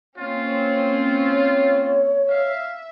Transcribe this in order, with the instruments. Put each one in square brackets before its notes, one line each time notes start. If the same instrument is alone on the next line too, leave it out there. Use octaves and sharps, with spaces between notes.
[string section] A#3 C4 C#4 [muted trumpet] F4
[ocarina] C#5
[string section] E5 [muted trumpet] F5